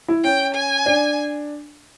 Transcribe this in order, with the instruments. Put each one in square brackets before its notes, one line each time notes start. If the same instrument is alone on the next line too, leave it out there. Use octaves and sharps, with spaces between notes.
[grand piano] E4
[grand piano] C#4 [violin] G5
[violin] G#5
[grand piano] D4